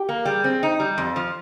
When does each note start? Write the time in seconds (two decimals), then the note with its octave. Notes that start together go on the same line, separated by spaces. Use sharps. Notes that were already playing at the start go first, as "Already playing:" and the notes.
Already playing: G4
0.09 A#3
0.25 G3 G#4
0.44 C4
0.63 D#4
0.80 G3
0.98 F2
1.16 F3